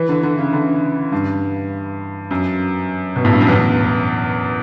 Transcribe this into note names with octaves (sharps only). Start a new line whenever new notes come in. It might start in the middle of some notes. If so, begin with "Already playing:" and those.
Already playing: E3
D3
D3
C#3
D3
G2
F#2
B2
A2
G2
F#2
E2